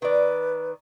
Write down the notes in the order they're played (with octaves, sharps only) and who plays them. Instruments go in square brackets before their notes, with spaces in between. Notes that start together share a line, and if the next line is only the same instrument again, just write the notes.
[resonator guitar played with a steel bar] D#3 D5 [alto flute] B4